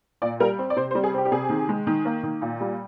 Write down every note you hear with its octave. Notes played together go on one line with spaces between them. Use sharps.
A#2 D5
G3 A#4
C4
D5
C3 C5
C5
G3
G#4
C4 G4
G4
C3 G#4
D#3
G#3
D#3
A#3
D#3
A#2
G3